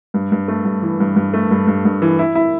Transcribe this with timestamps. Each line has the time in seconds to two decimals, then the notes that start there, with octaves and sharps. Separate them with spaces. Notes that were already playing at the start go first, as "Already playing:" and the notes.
0.14 G2
0.32 G2
0.48 A3
0.65 G2
0.82 E3
1.00 G2
1.16 G2
1.34 A3
1.51 G2
1.67 G2
1.85 G2
2.02 E3
2.19 E4
2.35 E4